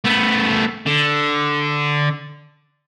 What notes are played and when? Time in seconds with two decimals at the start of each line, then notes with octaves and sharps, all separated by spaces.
0.05 A3 B3
0.86 D3